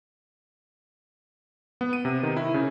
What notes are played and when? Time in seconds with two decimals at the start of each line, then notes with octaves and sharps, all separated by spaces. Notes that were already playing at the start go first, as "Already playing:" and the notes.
1.81 B3
1.93 D#7
2.05 C3
2.23 D#3
2.37 E4
2.54 C#3